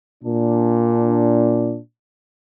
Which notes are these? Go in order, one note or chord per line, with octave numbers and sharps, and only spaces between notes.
A#2 D4